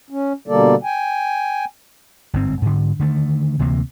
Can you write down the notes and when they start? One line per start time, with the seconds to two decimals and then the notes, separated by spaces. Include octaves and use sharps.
0.10 C#4
0.48 B2 D3 G3 A#3 A4 D5
0.83 G5 G#5
2.34 G1 G#2 C4
2.62 G#2 D3
2.99 D3 D#3 A3
3.59 D2 C3 E3 A#3